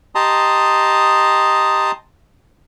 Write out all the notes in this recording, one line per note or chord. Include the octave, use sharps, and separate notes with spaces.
G4 D#5 A5 A#5 C6 D#6